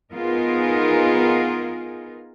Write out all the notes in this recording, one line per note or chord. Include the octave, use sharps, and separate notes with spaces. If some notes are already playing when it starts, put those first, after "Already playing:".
B3 D#4 F4 G#4 A#4